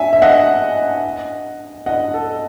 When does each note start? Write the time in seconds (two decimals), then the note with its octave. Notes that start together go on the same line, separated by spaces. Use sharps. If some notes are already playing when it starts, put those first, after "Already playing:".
Already playing: E5 G#5
0.13 E5
0.22 D#5 F#5
1.86 D#5 F#5
2.14 A4